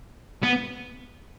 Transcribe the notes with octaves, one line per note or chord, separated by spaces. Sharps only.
B3